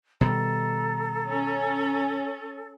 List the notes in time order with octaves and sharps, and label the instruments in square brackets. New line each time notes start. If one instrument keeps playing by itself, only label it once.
[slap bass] B2 D#3 G3 [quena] A4 [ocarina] A#5
[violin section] C#4